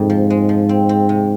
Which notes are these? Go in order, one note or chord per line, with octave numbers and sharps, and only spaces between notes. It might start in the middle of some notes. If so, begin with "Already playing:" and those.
Already playing: F2 G#2 C3
F3
G#3
F3
C4
C4
C3